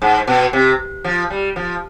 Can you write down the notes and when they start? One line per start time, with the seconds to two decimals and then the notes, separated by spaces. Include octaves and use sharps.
0.02 G#2
0.27 B2
0.53 C3
1.04 F3
1.30 G3
1.56 F3